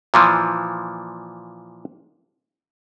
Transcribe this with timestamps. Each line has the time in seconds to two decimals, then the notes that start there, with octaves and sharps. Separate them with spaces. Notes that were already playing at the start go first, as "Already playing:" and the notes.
0.14 A#2 E3 F3